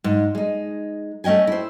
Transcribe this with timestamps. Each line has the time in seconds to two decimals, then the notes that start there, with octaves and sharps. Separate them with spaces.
0.04 G#2
0.35 G#3 D#4
1.24 A3 C#4 D#5 G5 G#5
1.47 E4 C5